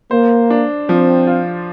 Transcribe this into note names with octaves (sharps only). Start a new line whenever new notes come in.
A#3 C5
D4
F3 C4
F4